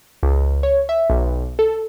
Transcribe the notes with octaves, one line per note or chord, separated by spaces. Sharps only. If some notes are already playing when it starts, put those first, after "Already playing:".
C#2
C#5
E5
B1
A4